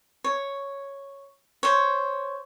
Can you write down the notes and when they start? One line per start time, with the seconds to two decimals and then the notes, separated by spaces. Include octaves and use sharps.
0.24 C#5
1.63 C5 C#5